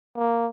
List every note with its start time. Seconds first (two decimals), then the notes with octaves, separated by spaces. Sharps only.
0.17 A#3